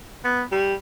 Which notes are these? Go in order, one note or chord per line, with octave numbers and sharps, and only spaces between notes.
B3
G3